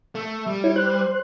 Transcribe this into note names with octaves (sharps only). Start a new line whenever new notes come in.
A3
G3
E4 C#5
C5 F#6